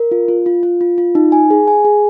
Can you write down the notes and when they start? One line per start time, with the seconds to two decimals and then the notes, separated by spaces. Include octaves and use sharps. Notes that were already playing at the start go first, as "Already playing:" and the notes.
Already playing: A#4
0.11 F4
0.28 F4
0.46 F4
0.63 F4
0.81 F4
0.98 F4
1.15 D#4
1.32 G#5
1.50 G#4
1.68 G#5
1.85 G#4